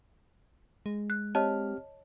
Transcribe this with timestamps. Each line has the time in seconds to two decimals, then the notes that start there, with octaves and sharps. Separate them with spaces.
0.86 G#3
1.10 F#6
1.35 C4 G4 C#5 D#5 A5 F6